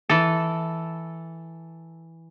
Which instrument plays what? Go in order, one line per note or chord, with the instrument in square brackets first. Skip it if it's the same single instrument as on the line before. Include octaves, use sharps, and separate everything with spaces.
[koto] E3 A4